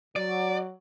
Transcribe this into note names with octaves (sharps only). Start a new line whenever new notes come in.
F#3 D5